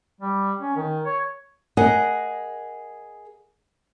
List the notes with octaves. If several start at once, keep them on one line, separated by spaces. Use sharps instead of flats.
G3
C#4
D#3
C#5
G#4 A#4 D#5 F#5